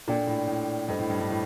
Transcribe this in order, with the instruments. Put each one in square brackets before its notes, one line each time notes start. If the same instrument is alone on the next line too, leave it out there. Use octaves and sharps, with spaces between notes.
[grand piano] A#2 [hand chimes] D4 A4 D5 G5
[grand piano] A2
A2
[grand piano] G2 [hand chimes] D4 A4 C5 D#5 G5
[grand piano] A2
G2
G2
A2